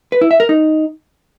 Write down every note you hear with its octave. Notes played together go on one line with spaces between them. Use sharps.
B4
E4
E5
A#4
D#4